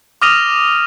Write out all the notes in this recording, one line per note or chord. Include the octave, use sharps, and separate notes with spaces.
D6 D#6 F6 A#6 D#7 F7